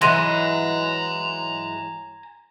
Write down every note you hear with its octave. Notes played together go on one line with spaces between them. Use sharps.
E3 F#3 G#3 G#5 A#5 C6 A#6 D#7